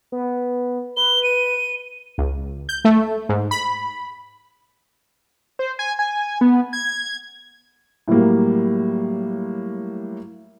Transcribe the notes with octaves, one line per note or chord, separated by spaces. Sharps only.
B3
B4 G7
D#7
C#2
G6
A3
G#2
B5
C5
G#5
G#5
B3
G#6
A2 F#3 G3 A#3